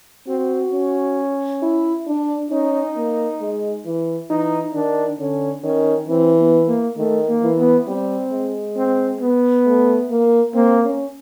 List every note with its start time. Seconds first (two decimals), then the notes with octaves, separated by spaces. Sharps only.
0.27 C4 F#4
0.72 C#4
1.62 E4
2.07 D4
2.51 C#4 D#4
2.96 A#3
3.41 G#3
3.86 E3
4.30 E3 D#4
4.74 D#3 D4
5.19 D3 C#4
5.64 D#3 C#4
6.09 E3 C4
6.39 B3
6.67 A#3
6.97 D#3 A3
7.28 A#3
7.43 E3
7.58 B3
7.87 G3 C4
8.31 G#3
8.76 C4
9.20 B3
9.66 A3
10.10 A#3
10.55 A#3 C4
10.84 C#4